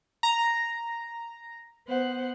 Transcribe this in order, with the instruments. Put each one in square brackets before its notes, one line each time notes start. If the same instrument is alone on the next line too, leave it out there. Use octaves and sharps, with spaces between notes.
[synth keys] A#5
[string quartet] B3 C5 F#5